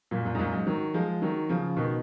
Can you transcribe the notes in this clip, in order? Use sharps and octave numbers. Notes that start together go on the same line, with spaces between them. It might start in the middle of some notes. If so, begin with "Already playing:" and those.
F#2 A#2
F#2 A#2
G#2
F#2 A#2
G#2
D#3 F#3
F3 G#3
D#3 F#3
C#3 F3
B2 D#3